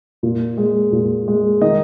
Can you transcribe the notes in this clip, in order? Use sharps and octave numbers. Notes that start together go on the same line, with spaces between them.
A#2
G#3
A#2
G#3
D#3 D#5